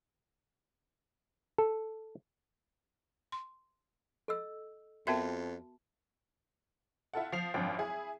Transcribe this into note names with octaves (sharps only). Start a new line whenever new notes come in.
A4
C6
A4 D#5 E6
F2 B3 F#4 A#4 E5 A5
E4 F4 A4 F#5
F3 C7 F7
G#1 F#2 F3 D4 G5
E4 G#4